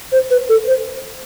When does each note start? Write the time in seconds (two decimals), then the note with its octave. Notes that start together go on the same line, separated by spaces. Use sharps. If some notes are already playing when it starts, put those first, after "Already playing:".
0.12 C5
0.30 B4
0.49 A4
0.67 C5